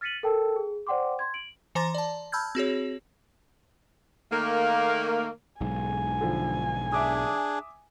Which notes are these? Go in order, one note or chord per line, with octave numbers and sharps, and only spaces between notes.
F6 A6 B6 C#7 D#7 F#7
A4 A#4 G5 A5 E6
G#4
C5 D5 F#5 G5 C6 D6
C6 G#6
D7 F#7
E3 C5 A#5 C6 A6 A#6
D5 A5
A5 B5 E6 F6 G6 G#6
C4 F#4 G#4 C#5
D#3 A3 A#3
B1 G#2 G#5
D3 F3
D4 G#4 E5 D6 D#6